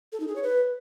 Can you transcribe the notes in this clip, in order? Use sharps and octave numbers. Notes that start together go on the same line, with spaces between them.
A4
D#4
G#4
C#5
B4